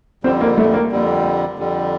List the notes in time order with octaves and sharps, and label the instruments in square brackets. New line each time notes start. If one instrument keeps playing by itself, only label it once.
[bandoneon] F2 D3 G3 [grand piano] C4
[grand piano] A#3
A3
A#3
[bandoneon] F2 D3 G3
F2 D3 G3